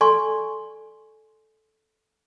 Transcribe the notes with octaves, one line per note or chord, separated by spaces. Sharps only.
A4 D5 G#5 C6 C#6